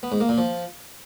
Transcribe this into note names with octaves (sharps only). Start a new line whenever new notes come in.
B3
G#2
A#3
A#2
F3